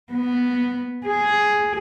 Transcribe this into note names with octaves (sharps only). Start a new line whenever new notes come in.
B3
G#4